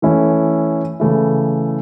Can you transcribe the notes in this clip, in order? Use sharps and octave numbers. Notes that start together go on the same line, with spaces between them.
E3 A3 C#4 E4
C#3 E3 A3 E4